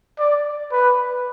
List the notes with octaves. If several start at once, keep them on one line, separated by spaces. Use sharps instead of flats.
D5
B4